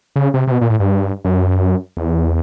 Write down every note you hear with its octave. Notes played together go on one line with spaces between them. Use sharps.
C#3
C3
C3
B2
A#2
A2
G2
F#2
E2